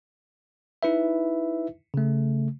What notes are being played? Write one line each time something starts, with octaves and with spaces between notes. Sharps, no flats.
D#4 E4 B4 E5
C#3 A3